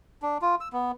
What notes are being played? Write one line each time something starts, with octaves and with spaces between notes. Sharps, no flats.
D4
F4
E6
B3